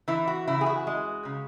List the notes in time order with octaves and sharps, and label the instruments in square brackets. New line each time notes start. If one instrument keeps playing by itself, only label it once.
[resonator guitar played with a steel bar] E3 E4
F#4
C#3 E4
G#4
F#4
G#3
C#3